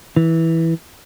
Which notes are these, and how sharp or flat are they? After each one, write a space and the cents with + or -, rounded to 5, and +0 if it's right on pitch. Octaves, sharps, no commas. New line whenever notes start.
E3 -10